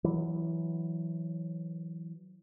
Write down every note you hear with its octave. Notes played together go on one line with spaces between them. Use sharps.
E3 F#3